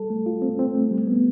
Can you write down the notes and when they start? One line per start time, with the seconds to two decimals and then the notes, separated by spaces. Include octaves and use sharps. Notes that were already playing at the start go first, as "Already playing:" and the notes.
Already playing: G3 A4
0.10 A3
0.26 F4
0.42 C4
0.59 C4
0.75 A3
0.91 G3
1.07 B3